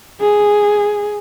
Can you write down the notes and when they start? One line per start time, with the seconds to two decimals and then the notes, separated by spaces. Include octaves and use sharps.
0.21 G#4